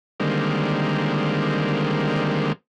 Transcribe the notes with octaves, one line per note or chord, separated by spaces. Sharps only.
D3 D#3 G3 G#3 A#3 C4